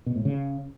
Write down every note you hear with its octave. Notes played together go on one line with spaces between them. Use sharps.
B2
A2
C#3